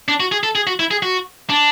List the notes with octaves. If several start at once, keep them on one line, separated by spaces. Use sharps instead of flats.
D4
F#4
G#4
A4
G#4
F#4
E4
G#4
F#4
D4